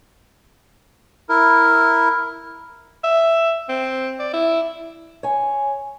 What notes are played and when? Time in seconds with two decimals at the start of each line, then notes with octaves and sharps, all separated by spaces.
1.29 E4 A#4
3.04 E5
3.69 C4
4.19 D5
4.33 E4
5.23 C#5 G#5